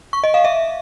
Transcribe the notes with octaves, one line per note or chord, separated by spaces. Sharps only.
C#6
D#5
F5
E5